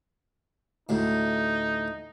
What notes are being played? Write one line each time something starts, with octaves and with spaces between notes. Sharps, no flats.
D2 A2 D#4